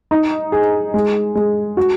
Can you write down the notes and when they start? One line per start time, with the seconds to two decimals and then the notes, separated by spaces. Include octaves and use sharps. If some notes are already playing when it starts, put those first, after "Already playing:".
0.11 D#4
0.52 G#4
0.94 G#3
1.35 G#3
1.77 F#4